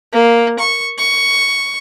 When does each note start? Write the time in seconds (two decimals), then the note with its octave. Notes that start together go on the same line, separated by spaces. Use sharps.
0.13 A#3
0.59 C#6
0.98 C#6